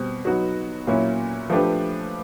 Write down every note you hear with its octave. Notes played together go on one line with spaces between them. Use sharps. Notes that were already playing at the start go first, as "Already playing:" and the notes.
Already playing: B2 G3 C4
F#3 B3 D#4 F#4
A#2 F#3 A#3 C#4 E4
F3 A3 D4 G4 B4